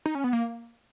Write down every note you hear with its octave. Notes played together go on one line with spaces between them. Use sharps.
D#4
C#4
B3
A#3